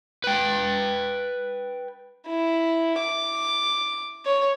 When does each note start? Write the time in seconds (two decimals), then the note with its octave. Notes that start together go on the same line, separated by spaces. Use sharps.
0.24 B4 G5
2.27 E4
2.99 D6
4.26 C#5